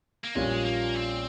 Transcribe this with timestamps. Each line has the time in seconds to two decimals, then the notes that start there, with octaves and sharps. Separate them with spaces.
0.24 A#3
0.35 A#1 A#2 G3 G#3 C#4 F4
0.66 A#3
0.95 C4